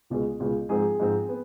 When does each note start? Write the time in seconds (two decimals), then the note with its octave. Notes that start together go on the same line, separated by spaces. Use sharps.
0.10 C#2 B2 G#3
0.40 C#2 B2 G#3
0.69 G#2 F3 G#3 C4 G#4
1.00 G#2 F3 G#3 C4
1.29 B3